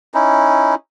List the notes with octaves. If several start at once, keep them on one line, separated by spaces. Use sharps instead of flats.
C#4 D#4 E4